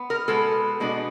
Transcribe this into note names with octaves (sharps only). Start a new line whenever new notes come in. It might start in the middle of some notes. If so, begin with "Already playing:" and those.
Already playing: B3
A#4
B2 G#3 B3 A4
B2 G#3 B3 D4